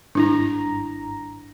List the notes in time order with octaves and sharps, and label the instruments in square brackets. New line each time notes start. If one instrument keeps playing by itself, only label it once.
[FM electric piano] G#1 G2 A#5 [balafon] D4 E4